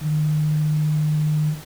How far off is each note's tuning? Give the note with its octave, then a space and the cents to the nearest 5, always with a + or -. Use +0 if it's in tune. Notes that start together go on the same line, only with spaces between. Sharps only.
D#3 -35